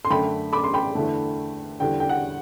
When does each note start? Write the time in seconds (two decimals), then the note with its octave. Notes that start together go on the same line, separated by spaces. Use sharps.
0.05 C6
0.10 F#2 D3 A3 G5 B5
0.53 B5 D6
0.64 C6
0.74 G5 B5
0.95 E2 D3 A3
1.80 E2 D3 G3 G5
2.00 G5
2.09 F#5